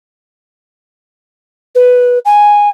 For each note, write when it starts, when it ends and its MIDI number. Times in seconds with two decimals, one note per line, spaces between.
1.75 2.19 71
2.25 2.69 80